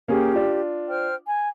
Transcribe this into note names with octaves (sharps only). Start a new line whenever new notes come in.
A#3 C#4 G4 G#4
D4 F4
C5 G5 F6
G#5